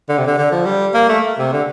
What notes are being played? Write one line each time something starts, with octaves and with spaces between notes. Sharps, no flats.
D3
C3
D3
D3
F3
G3
A#3
A3
C3
D3